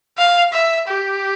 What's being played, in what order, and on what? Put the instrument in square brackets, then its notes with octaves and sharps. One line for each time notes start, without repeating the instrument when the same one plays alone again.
[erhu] F5
E5
G4